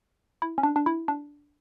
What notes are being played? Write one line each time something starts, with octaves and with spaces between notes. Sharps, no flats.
E4
C#4
D4
D4
E4
D4